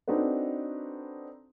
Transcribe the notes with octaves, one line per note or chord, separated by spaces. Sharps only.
C4 D4 D#4 F#4 A4 B4